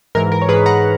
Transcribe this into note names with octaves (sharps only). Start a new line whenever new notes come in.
G#2 E3 A#4
A#4
C#5
G#2 E3 G#4 B4
F#5 A#5